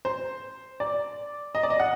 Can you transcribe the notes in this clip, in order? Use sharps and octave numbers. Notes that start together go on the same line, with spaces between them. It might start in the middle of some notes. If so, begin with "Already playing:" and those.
C5
D5
D#5
D5
D#5
F#5